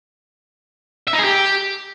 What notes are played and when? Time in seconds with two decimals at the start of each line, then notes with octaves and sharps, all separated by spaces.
1.08 E5
1.13 D#4
1.19 G#4
1.24 G4